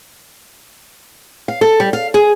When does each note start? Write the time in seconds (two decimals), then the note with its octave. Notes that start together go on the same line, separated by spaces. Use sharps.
1.48 F5
1.61 A4
1.80 G3
1.93 F5
2.14 G#4